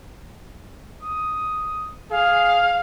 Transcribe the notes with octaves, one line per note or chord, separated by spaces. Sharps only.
D#6
G#4 F5